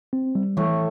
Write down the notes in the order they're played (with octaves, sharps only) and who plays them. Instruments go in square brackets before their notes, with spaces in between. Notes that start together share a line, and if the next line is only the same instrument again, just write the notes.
[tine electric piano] C4
G3
[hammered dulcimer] A2 A3 [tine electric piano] E3